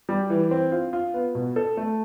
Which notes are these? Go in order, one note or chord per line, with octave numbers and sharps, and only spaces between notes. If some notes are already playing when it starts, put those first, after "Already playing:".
G3
E3
C4
F4
F4
B3
B2
A4
A3